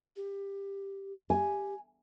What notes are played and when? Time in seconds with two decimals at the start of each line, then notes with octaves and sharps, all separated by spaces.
0.16 G4
1.30 G4 G#5